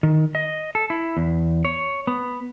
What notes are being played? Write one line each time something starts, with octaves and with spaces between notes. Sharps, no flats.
D#3
D#5
A4
E4
E2
C#5
B3